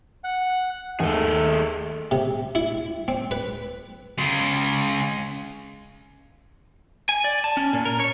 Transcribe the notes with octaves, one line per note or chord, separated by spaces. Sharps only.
F#5
D#2 D#3 A3 G#4
C3
E4
C4
B4
C#3 G#3
G#5
D5
A5
C#4
A#2
A#4
C#5